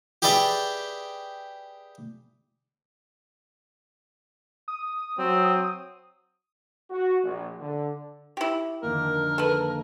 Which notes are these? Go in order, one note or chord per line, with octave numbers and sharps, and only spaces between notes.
G4 G#4 B4 D5 E5 G5
D#6
F#3 C4
F#4
A#1
D3
E4 G4
F2 D3 D#3 A#3 A#4
A4 B4